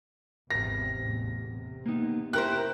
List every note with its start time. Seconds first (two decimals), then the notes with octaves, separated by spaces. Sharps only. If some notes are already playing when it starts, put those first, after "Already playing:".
0.51 G#1 E2 C3 A#6
1.01 A1 E2
1.46 C3
1.86 A#3 B3 D#4
2.33 E4 G4 A#4 C5 F#6